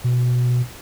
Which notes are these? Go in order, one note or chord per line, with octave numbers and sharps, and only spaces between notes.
B2